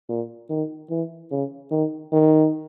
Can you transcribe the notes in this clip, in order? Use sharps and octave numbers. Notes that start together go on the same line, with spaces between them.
A#2
D#3
E3
C#3
D#3
D#3